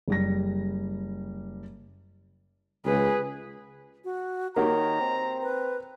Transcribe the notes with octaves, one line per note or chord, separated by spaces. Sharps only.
F#1 G3 A#6
C#2 G#4 B4
F#4
D#3 A#3 F#4 G4 C#5 A#5
C4
B4